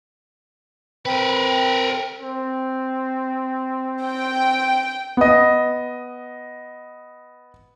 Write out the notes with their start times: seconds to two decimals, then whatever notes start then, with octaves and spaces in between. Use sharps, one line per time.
1.06 C4 A#4 B4
2.20 C4
4.03 G5
5.17 B3 D#5